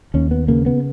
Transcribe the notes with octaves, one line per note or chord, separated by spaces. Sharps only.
D#2 C#4
B3
C#3 A#3
B3